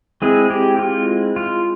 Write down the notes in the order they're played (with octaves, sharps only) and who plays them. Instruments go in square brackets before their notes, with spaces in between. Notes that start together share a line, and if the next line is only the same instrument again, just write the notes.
[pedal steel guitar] G#3 C4 E4 G#4
G4
F4
F4